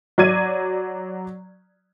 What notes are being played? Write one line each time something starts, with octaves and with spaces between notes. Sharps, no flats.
F#3 D5 G#6 D#7